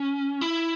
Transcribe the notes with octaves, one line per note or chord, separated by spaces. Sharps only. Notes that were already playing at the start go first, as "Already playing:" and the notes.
Already playing: C#4
E4